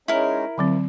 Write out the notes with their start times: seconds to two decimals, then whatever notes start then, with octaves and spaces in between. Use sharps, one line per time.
0.08 G#3 C#4 D#4 E4 A#4
0.58 D3 F3 F#3 C4